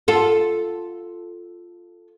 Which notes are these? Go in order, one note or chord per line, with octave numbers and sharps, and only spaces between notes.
F4 A4